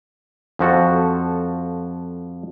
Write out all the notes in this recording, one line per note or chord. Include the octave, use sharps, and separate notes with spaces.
F2 F3 F#4 A4